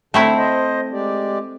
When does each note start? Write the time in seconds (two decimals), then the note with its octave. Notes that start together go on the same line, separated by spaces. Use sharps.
0.14 D3 A3 C4 E4
0.37 C5 D#5
0.92 G#3 G4 D5